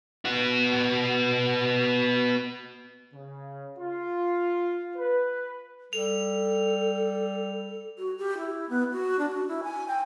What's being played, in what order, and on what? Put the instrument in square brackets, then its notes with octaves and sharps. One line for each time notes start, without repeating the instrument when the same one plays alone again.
[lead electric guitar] B3 F#4
[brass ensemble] C#3
F4
B4
[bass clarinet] G3 [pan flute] A4 [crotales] F7
[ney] F#4
G4
E4
B3
F#4
D4
F#4
E4
G#5
G5